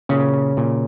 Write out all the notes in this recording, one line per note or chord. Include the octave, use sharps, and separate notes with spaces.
A#2 C#3 C#4
A#2